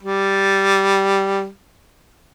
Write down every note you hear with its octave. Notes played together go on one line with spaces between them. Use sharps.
G3